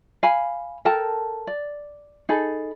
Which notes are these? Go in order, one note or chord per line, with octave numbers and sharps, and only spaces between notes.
F5 G#5 B5
A4 A#4 G5 A5
D5
D#4 G#4 A4 B5